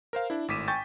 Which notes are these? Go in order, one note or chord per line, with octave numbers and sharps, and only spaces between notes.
A#4 C5 F5
D4 E4
G#1 A2 D6 B6 D#7 E7
G5 G#5 C#6 G6 A6